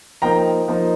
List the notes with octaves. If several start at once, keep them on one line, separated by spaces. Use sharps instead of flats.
F3 A#3 D#4 G5 A#5
F3 A#3 D#4